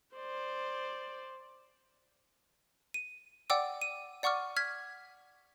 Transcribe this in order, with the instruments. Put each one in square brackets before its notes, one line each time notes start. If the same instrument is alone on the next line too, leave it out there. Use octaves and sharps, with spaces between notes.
[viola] C5 D5
[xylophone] D#7
D5 F#5 G5 D6 E6
D#7
D5 F#5 C#6 D6 F6
F6 G#6 B6